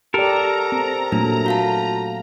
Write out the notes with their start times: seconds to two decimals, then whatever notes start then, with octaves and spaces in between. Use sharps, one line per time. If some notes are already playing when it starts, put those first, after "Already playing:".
0.14 G4 A4 A#4 D5 A#5
0.72 C4
1.12 A#2 F#3 A3 D4
1.46 F#4 F5 A5